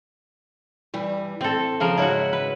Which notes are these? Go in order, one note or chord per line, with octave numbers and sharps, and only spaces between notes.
G2 E3 G3
A2 C4 A4
C#3 F3 A#4
G#2 E4 F#4 C#5
B4